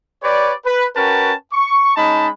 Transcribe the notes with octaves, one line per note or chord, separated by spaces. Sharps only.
G4 B4 C#5 D5
B4
C#4 F#4 A#4 B4 G5 A5
C#6
G#3 C#4 D#4 A5 B5